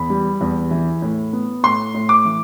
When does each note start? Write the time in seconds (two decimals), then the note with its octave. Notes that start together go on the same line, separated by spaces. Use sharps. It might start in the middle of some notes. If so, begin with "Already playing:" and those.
Already playing: E2 B5
0.10 G3
0.41 E2
0.71 E3
1.02 A2
1.33 B3
1.63 A2 C6
1.94 A2
2.09 D6
2.25 E3